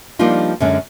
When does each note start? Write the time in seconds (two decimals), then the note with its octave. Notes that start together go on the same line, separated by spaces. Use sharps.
0.19 F3 G3 A#3 D4 D#4 F4
0.60 F#2 D3 G#3 C#4